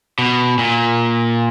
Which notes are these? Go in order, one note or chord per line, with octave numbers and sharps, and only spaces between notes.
B2
A#2